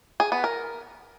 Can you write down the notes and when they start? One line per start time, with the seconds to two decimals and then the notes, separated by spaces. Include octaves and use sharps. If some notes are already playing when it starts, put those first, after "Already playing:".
0.20 G#4
0.32 B3
0.44 A#4